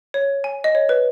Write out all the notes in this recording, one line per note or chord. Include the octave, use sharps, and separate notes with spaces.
C#5
G#5
D#5
C#5
B4